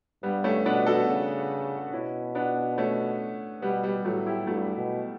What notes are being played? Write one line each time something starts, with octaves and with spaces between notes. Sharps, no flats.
G2 G3 B3
A3 C#4
B2 B3 D4
F#4 A4
C#3
B2 C#4 E4
B3 D4
A3 C#4
B2 G3 B3
G3 B3
A2 F#3 A3
E4 G4
G2 F#3 A3
B2